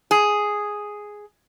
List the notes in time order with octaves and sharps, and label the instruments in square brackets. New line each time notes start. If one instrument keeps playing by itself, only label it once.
[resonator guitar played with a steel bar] G#4